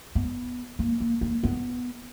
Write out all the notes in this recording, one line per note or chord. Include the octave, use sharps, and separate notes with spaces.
B3
A#3
A#3
A#3
B3